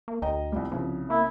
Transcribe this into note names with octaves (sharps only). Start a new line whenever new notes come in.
A#3
D2 D#5 G5 A#5
C2 F3 G3
C2 C#3 F3
A#3 E4